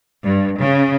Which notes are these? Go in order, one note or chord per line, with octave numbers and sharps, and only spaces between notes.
G2
C#3